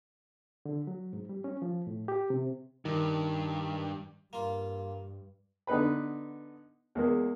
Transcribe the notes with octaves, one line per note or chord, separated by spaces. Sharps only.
D3
F#3
G#2
G3
C#4
F3
A2
G4
C3
G2 D#3
G2 A#3 F4
D3 B3 D#4 B4 B5
E2 G#3 A#3